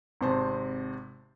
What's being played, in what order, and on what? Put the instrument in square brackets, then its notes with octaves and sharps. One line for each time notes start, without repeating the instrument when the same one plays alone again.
[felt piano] G#1 C3 C5 A5